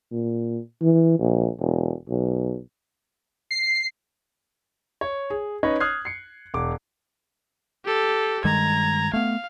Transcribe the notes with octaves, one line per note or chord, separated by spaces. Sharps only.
A#2
E3
A#1
E1
B1
C7
C#5
G#4
C#4 D#4 B4 C#5 D#5
D#6 F6 F#6 G#6 C7
C7 C#7
E1 D6
G4 A4
G2 D#3 G#3 A#5 G#6
A3 B3 F5